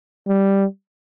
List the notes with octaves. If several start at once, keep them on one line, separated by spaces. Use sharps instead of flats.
G3